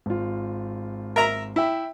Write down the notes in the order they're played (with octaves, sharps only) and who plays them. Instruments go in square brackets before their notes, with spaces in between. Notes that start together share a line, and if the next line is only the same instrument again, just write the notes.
[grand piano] G#1 F4
[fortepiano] A#4 E5 A#5
[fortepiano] E4 [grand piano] E5 G5